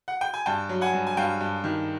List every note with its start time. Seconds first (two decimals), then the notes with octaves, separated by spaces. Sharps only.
0.08 F#5
0.21 G5
0.34 G#5
0.46 G2 G5 A5
0.69 F#3
0.81 F#5 G#5
0.93 G2
1.07 G#5
1.17 G2 F5 G5
1.41 G2
1.64 D#3